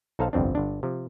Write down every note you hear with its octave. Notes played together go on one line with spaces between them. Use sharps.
B1 D#4 A4 C5 F5 A5
G1 C2 F2 C4 D4
G1 D4
C3 F3